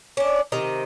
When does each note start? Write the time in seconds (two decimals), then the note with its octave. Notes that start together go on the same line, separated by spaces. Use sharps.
0.17 C#4 D4
0.52 C3 D#3 D#5 A#5